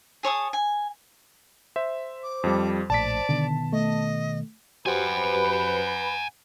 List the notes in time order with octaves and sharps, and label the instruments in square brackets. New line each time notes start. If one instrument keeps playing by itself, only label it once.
[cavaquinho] G#4 C#5 A5 D#6
G#5
[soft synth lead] C5 [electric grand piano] E5
[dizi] D6
[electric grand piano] F2 F3 G3
[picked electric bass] A#1 A2 [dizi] D5 [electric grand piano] A5 B6
[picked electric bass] B2 D#3 B3 [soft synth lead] D3
[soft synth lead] A3 [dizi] D#5
[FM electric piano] F#4 G4 C5 [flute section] B4 B5 [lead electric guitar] F#5 G#5